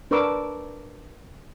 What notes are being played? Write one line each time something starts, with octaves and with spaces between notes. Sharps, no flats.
D4 A#4 B4 C#6 D6 E6